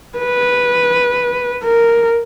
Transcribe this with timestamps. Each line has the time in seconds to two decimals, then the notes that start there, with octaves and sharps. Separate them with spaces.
0.18 B4
1.64 A#4